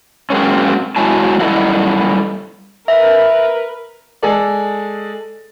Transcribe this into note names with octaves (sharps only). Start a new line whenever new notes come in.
F#3 G#3 A#3 C4 C#4
F#3 G#3 E4 F#4 G#5 A5
F#2 G3 E4 A4 D#5 F#5
A#4 B4 E5
G#3 G#4 A4 D5